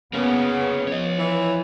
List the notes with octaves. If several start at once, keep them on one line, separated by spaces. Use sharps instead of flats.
C#3 A#3 B3 C#4
F3 C#5 D#5
E3